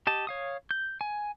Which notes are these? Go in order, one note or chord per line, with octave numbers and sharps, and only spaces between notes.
G4 D#5 A5
C#5 F5 D#6
G6
G#5